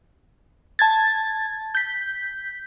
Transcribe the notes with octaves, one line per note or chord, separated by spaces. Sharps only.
A5 G#6 A6
G6 B6